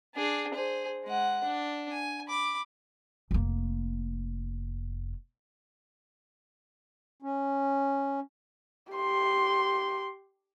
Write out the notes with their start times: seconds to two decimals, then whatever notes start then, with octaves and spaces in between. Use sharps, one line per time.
0.15 D4 G#4
0.54 G#4 C5
1.05 G#3 F#5
1.44 D4
1.92 G#5
2.29 B5 D6
3.31 F1 A#3
7.22 C#4
8.93 G4 C6